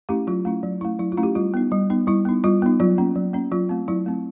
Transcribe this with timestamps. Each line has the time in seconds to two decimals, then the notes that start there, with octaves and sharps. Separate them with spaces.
0.09 A3 C#4 E4 G4
0.27 F#3 F4
0.45 A3 C#4 E4
0.63 F#3
0.81 A3 C#4 E4
0.99 F#3 E4
1.12 F4
1.17 A3 C#4 E4
1.23 G4
1.35 G3 F4
1.54 B3 D#4
1.71 G3
1.90 B3 D#4
2.07 G3 E4
2.25 B3 D#4
2.44 G3 F4
2.62 B3 D#4
2.80 F#3 F4
2.98 A#3 C#4
3.15 F#3
3.33 A#3 C#4
3.51 F#3 F4
3.69 A3 C4
3.88 F#3 E4
4.06 A3 C4